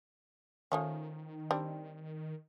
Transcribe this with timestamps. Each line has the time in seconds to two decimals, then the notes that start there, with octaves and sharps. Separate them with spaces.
0.72 D#3 F3 A3 C#4
1.51 G3 C4 D4